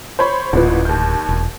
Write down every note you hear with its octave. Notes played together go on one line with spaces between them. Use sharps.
C5 C#5 B5
D1 A1 A#2 B4
D#2 G6
E1